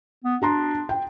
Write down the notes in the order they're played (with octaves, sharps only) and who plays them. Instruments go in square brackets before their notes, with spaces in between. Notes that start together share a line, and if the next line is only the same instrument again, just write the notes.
[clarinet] B3
[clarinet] D4 [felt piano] F#4 A#5 C6
[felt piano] G5